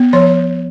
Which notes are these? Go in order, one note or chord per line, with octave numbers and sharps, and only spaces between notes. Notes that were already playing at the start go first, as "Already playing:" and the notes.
Already playing: B3
F3 C#5